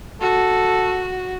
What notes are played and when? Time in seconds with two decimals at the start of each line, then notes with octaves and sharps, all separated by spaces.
0.21 F#4 A4